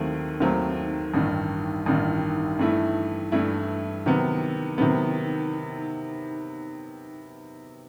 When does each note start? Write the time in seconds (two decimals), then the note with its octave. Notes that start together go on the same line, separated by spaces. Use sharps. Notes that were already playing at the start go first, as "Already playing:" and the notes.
Already playing: D#2 D#3 F#3 A3 C4
0.40 D#2 D#3 F#3 A3 C4
1.14 A1 G2 D#3
1.86 A1 G2 D#3
2.59 G2 E3 A3 E4
3.32 G2 E3 A3 E4
4.06 C3 D#3 F#3 B3
4.78 C3 D#3 F#3 B3